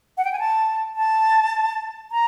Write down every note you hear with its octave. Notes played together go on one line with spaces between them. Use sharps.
F#5
G5
G#5
A5
A5
A#5